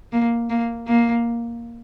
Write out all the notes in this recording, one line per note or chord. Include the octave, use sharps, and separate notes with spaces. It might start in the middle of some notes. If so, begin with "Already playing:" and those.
A#3
A#3
A#3